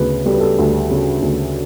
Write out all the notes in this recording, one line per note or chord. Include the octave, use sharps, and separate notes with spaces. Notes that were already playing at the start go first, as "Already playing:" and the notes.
Already playing: D2 C#3 B4
G3 A4
B4
A4
D2
C#3
D2